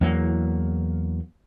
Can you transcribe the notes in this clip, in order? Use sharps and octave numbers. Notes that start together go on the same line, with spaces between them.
E2 F#3 A#3